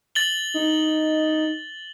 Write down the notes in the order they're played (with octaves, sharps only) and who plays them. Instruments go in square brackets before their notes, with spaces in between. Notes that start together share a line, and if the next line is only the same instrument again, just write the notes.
[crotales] A6 F#7 G7
[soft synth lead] D#4